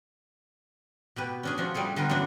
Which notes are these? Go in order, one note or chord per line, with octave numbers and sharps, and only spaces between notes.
B2 G4 B4
C#4 D4 G#4
F3 D4 F4 F#4
G3 A3 G#4 A4
D3 G3 B3 F4 A#4 B4
F#2 E3 F#3 D4